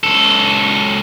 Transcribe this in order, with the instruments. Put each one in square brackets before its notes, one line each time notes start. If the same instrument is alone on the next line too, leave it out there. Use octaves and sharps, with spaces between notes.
[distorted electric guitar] C#2 A4